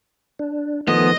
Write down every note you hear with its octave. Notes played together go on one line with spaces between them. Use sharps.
D4
D#3 F3 A3 B3 D#5